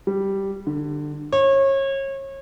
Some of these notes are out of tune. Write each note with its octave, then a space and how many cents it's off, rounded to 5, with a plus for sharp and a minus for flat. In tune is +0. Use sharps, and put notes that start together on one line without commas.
G3 -5
D3 +25
C#5 -30